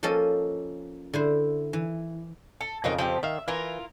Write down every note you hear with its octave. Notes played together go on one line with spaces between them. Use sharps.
F3 A#3 C#4 A4 D#5 A5
D3 E4 C5
E3
A4
F2 C#3 F#3 D#4 A#4
F3 C4 G4
D#3 E5 F5
E3 E4 F4 A#4